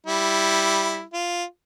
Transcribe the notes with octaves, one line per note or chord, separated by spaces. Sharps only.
G3 E4
F4